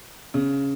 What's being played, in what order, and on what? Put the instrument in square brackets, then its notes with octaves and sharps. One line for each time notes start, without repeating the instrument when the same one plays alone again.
[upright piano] C#3